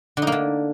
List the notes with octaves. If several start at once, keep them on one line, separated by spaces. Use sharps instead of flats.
D3
D#4
A#3
D3